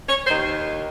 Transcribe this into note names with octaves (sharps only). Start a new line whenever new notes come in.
C#5
D#2 D#3 C5